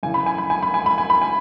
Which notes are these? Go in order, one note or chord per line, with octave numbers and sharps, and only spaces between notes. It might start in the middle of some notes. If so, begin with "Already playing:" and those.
F#2 C#3 E3 G#5
B5
G#5
B5
G#5
B5
G#5
B5
G#5
B5
G#5